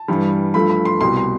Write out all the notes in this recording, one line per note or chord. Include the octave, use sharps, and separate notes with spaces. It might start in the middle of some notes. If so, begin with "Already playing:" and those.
Already playing: A5
G2 E3 G3
G2 F3 A3 B5
B5
C6
C2 B2 G3 C6
C6